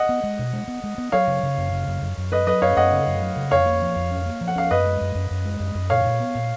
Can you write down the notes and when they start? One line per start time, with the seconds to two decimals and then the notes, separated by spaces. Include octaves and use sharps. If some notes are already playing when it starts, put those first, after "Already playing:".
Already playing: D#5 F#5
0.09 B3
0.24 G#3
0.39 B2
0.53 G#3
0.68 B3
0.84 G#3
0.98 B3
1.12 F#3 C#5 F5
1.27 C#3
1.43 C#3
1.57 F#2
1.73 C#3
1.88 F#2
2.02 F#2
2.18 F#2
2.32 F#3 B4 D#5
2.47 F#3 B4 D#5
2.62 F#2 C#5 F5
2.77 F#2 D#5 F#5
2.92 C#3
3.07 F#2
3.22 F#3
3.36 C#3
3.51 F2 C#5 F5
3.66 A#3
3.82 F3
3.96 F2
4.11 C#4
4.26 A#3
4.41 F3
4.47 F#5
4.56 C#4 F5
4.71 F#2 B4 D#5
4.86 G#3
5.01 F#2
5.15 F#2
5.31 F#2
5.45 G#3
5.60 F#2
5.75 F#2
5.90 A#2 C#5 F5
6.05 A#2
6.20 B3
6.35 A#2